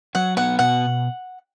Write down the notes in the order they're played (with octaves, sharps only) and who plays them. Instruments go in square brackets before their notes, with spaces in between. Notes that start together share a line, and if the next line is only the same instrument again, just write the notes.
[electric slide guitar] F#3 [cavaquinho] F#5
[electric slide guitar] B3 [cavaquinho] F#5
[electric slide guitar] B2 [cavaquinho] F#5